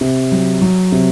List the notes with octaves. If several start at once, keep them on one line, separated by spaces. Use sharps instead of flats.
C3
F#3
F#3
C3